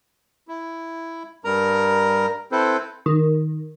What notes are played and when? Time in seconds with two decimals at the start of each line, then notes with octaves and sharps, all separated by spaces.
0.48 E4
1.44 G2 G3 A#4 A#5
2.52 C4 E4 A4 B4 C5
3.06 D#3